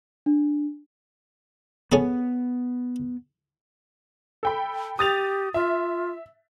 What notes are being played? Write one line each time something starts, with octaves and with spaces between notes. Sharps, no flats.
D4
B3 C#4 G#4 A4
A4 G5 B5
G4 D#6 A6 F7
F4 E5